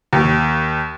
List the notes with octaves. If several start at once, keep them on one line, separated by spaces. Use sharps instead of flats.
D#2